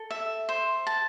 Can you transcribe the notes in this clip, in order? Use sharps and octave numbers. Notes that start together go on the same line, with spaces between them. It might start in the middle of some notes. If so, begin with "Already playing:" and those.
Already playing: A4
E5
C5
A5